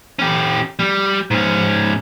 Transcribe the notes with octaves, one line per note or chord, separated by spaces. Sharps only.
C#4 G4
G3
G#2 C#4